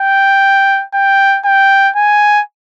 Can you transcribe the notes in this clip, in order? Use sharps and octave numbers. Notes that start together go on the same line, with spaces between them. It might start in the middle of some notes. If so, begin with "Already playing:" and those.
Already playing: G5
G5
G5
G#5